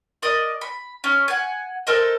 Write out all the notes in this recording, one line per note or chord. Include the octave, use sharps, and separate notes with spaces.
A#4 D5 D#5 D#6
B5
C#4
F#5 G#5
A4 A#4 C5 D#5